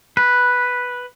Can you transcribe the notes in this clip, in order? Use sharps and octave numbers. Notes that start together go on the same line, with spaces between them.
B4